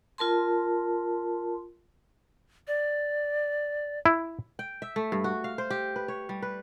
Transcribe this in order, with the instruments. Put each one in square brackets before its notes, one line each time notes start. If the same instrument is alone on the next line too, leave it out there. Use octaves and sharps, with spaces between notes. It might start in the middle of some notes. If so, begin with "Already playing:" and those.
[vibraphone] F4 A#4 A5 C6
[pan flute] D5
[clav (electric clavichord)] E4
[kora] G5
E5
A3
G2
F#4
F5
C5
G4
B4
C#5
G3
B4